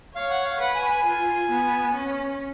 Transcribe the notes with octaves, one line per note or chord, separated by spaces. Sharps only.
C#5 F5
F#5
F5
B4 F#5
G#5
G#5
F4 G#5
B3
C#4